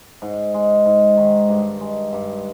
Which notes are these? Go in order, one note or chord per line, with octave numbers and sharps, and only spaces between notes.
G#2
G#3
G#2
D#3
G2
G#3
G2